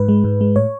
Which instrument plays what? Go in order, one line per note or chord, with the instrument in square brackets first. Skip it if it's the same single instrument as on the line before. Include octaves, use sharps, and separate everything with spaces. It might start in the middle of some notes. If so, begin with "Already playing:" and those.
Already playing: [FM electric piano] G#2 B4
G#3
G#2
G#3
A2 C#5